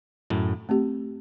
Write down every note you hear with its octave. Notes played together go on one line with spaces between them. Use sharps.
F#2 A2
A3 C4 G4